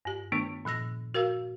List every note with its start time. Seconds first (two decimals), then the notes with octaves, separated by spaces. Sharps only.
0.05 G2 G4
0.32 D#3 A3 B3 D4
0.65 A#2 F3 E6 A#6
1.14 F#4 A#4 F5 E6